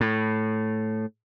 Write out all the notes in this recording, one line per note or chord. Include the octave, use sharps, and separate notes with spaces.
A2